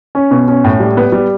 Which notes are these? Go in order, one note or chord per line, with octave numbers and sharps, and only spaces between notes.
C#4
B2
C#4
A2
G3
B3
G3